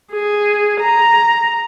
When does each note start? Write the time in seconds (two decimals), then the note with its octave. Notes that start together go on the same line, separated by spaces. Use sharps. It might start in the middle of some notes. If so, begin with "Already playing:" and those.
0.12 G#4
0.81 A#5